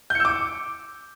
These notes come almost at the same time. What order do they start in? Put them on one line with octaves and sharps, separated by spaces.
G6 C#7 E6 D6